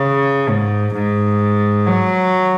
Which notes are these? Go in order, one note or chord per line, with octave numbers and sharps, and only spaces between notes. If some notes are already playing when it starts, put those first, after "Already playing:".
Already playing: C#3
G#2
G#2
F#3